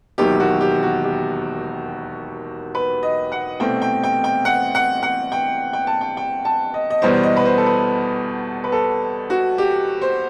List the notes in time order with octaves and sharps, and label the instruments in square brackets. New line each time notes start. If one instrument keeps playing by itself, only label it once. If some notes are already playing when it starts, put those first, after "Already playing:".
[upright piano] E1 D#2 D#3 F#3 G4
F#4
G4
F#4
G4
B4
D#5
F#5
C2 B2 A3 C4 G5
G5
G5
G5
F#5
F#5
F#5
G5
G5
A5
G5
G5
A5
D#5
D#5
E2 B2 G3 B3 C5
D#5
B4
C5
A4
B4
B4
A4
F#4
G4
C5